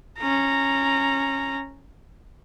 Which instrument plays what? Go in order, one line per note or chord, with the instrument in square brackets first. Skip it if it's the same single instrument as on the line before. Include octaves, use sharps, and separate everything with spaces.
[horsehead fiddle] C#4 A#5